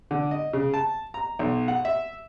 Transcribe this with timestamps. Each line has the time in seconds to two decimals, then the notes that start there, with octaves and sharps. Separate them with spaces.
0.11 D3
0.31 D#5
0.53 C#3
0.74 A5
1.14 A#5
1.39 B1
1.68 F#5
1.85 E5